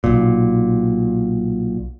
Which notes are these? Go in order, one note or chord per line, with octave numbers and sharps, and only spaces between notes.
B1 A#2